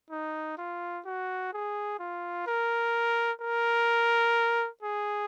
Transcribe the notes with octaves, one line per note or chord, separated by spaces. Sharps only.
D#4
F4
F#4
G#4
F4
A#4
A#4
G#4